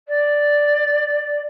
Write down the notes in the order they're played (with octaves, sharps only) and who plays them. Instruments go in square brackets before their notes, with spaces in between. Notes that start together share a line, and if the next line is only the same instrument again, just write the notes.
[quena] D5